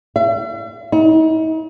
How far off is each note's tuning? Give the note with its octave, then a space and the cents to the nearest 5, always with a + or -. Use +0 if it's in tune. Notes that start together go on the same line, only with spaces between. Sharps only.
E5 +45
D#4 +40